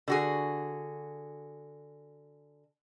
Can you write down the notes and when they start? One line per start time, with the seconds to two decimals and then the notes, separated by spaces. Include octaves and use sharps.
0.08 D3 F#4 G#4